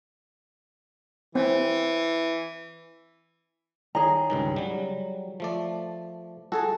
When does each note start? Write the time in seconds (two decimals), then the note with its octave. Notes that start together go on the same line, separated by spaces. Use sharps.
1.35 E3 C4
3.95 D#3 G#4 C#5 A#5
4.30 C#2 G2 D#3
4.56 F#3 G3
5.40 F3 A3 D5
6.52 F#4 G#4 A4 A5